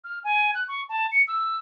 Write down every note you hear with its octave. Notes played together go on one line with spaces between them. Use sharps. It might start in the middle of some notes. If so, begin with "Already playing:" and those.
F6
G#5
F#6
C#6
A5
C#7
E6